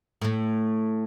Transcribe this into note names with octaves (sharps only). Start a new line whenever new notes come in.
A2 A3